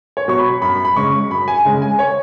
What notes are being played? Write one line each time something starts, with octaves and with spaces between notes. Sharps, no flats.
C#5
B2 F#3 C#6
B5
F#2 B5
B5
C#3 G#3 C#4 C#6
F#2 B5
G#5
C#3 G#3 C#4
G#5
C#5